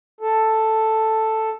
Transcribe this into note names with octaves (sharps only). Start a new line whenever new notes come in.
A4